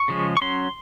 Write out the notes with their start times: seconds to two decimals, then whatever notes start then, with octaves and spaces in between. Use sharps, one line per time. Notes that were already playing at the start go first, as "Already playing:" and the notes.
Already playing: C#6
0.08 C#3 F3 G#3
0.37 C#6
0.41 F#3 C#4 C6